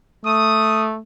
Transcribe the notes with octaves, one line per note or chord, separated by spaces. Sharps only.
A3 D#6